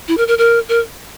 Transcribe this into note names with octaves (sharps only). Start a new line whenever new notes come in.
E4
A#4
A#4
A#4
A#4